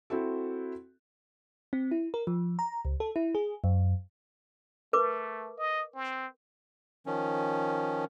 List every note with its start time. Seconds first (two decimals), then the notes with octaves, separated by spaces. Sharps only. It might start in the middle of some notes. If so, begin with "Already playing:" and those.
0.10 C4 E4 F#4 A4
1.73 C4
1.91 E4
2.14 A#4
2.27 F3
2.59 A#5
2.85 C#2
3.00 A4
3.16 E4
3.35 G#4
3.64 F#2
4.93 A3 A#4 B4 D6
5.58 D#5
5.95 C4
7.06 D#3 F3 C#4